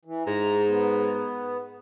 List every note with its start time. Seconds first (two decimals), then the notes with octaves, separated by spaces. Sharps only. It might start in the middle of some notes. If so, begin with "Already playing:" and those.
0.05 E3
0.26 G#2 A#5
0.67 B3